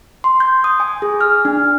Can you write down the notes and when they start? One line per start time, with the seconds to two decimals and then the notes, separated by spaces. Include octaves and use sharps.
0.24 C6
0.40 G6
0.64 D#6
0.80 G#5
1.02 G#4
1.21 F6
1.45 D4